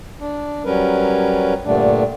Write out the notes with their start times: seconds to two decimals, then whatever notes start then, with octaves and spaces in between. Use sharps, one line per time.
0.20 D4
0.65 F#3 G3 C#4 A#4 B4
1.65 G2 A#2 D3 G3 A3 D4